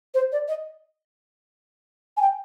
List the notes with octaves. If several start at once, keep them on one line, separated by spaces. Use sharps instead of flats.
C5
D5
D#5
G#5
G5